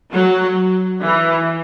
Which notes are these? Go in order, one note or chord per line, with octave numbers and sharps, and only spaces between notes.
F#3
E3